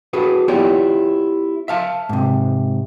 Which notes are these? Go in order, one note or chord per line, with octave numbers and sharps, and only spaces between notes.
F#4 G#4 A4 B4
B3 E4 F4 G4 C#5 D5
E5 F5 A5
G#2 C3